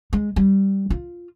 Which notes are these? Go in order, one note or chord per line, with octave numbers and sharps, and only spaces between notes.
G#3
G3
F4